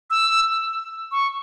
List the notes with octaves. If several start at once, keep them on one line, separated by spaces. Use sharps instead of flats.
E6
C#6